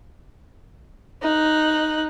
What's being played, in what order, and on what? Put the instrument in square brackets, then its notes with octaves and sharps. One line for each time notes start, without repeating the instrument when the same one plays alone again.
[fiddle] D#4 F#6